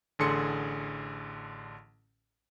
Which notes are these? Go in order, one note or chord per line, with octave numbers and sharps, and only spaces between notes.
A1 D3 G#4 A4 C6 C#7